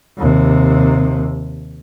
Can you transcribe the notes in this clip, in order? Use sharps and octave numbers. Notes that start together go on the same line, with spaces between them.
D#2 C3